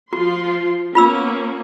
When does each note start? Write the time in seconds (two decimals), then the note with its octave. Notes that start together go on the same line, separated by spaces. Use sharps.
0.13 F3 F4 F#4 C6
0.95 A#3 B3 C#4 F4 B5 E6